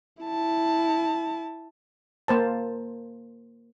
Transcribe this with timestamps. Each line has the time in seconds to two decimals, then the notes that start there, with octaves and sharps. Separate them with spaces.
0.23 E4 A5
2.28 A#3 C5 A5